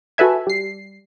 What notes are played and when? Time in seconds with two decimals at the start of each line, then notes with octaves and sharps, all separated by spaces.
0.18 F#4 A4 B4 E5 G#5
0.47 G3 C7